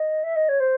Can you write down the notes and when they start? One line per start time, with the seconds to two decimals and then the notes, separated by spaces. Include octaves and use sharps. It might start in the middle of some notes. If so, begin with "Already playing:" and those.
Already playing: D#5
0.23 E5
0.36 D#5
0.49 C#5
0.60 C5